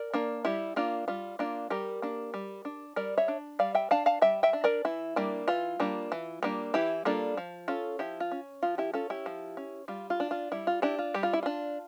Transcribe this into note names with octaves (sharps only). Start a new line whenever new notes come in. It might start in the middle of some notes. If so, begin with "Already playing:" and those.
Already playing: A#4 D5
A#3 D4
G3 E4 G4
A#3 D4 F4
G3 F4
A#3 D4 F4
G3 G4 A#4
A#3 D4
G3
D4
G3 A#4 D5
C#5 E5
D4
G3 D5 F5
E5 G5
D4 F5 A5
F5 A5
G3 E5 G5
E5 G5
D4
A#4 D5
E3 E4
G3 A#3 D4
E3 F4
G3 A#3 D4
E3
G3 A#3 D4
E3 E4 G4
G3 A#3 D4 F4 A4
F3
C#4 F4 A4
F3 E4 G4
F4
C#4
F3 F4
E4 G4
C#4 F4 A4
E4 G4
F3
C#4
G3 F4
F4
D4
F4
G3 E4
F4
D4 E4 G4
F4
G3 G4
F4
E4
D4 F4